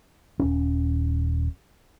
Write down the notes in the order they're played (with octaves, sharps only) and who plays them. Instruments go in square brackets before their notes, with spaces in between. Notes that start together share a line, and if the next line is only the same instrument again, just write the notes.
[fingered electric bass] D#1 C#4